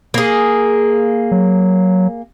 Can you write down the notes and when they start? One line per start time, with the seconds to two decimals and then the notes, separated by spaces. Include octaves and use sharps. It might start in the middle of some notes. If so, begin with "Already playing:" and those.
0.14 A#3 G#4
1.32 F#3